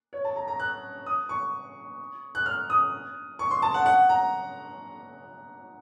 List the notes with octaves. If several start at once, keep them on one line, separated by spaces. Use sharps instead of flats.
C#5
A5
A#5
A#5
F#6
D#6
C#6
F#6
F6
D#6
C#6
C6
A5
F#5
F#5
A#5